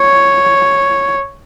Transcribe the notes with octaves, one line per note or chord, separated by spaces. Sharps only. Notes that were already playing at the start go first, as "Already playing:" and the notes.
Already playing: C#5